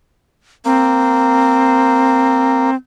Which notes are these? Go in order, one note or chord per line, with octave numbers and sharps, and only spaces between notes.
A#3 C4